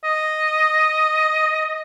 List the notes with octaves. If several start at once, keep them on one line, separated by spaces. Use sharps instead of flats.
D#5